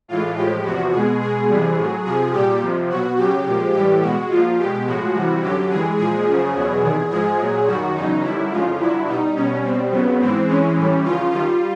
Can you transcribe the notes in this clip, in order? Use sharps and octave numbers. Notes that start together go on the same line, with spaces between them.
A2 E3 G#3 F4
A2 F3 G#3 G4
E2 C3 F3 F#4
B2 G#3 G#4
B2 G#3 G#4
F2 C3 E3 G3
A2 F#3
F2 C3 F3 G#4
A#2 G3 G4
F2 C3 F3
B2 F#3 F#4
F#2 C#3 F#3 G4
A#2 F3 G#3
A2 E3 G3 G4
B2 G#3 F#4
A#2 F3 G#3 F4
B2 G#3 G4
A2 F3 G#3 F#4
F2 C3 E3 G3
F#2 D3 F#3 G4
G2 E3 G#3 G#4
A#2 F3 G#3 G#4
F#2 C#3 F3
E2 B2 F#3
E2 C3 D#3
G#2 F3 G#3 G#4
A#2 F#3
F#2 D#3 G3 F#4
E2 C#3 F#3 D#4
F#2 D3 G3 E4
F2 C#3 F3 G#3 F4
G2 D3 F#3 E4
B2 G3 D#4
B2 G3 C#4
B2 G3 C4
F2 C#3 F#3 B3
G#2 E3 G#3 C4
G2 E3 G#3 C#4
A2 E3 G3
E2 C#3 F3 F4
F#2 D#3 G3 F4